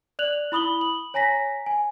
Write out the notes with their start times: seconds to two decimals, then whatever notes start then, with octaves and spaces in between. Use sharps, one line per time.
0.19 D5 F#6 F7 F#7
0.52 E4 B5 D#6 F#7 G7
0.81 F#7
1.14 C#5 G#5 A#5 A#6 B6
1.66 G#5